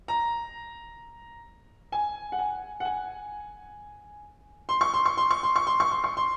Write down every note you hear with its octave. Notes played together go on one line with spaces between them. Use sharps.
A#5
G#5
F#5
G#5
F#5
G#5
C6
C#6
C6
C#6
C6
C#6
C6
C#6
C6
C#6
C6
C#6
C6